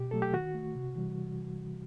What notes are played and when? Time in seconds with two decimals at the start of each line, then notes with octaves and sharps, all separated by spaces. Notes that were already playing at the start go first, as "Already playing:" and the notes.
Already playing: B2 G4
0.11 F#3 A3 A4
0.22 G4
0.34 D#3 F#4
0.54 A3
0.75 C3
0.96 E3 G3